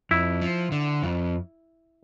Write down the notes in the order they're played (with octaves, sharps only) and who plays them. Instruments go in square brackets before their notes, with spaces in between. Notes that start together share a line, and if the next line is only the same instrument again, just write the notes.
[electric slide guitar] F2 [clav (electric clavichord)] E4
[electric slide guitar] F3
D3
F2